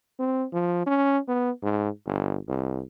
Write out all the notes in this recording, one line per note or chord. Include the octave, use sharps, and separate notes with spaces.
C4
F3
C#4
B3
G#2
G1
C2